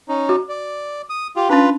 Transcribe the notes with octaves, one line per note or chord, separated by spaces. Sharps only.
C#4 D#4
F#4
D5
D#6
F4 G4
C#4 D4 F4 B4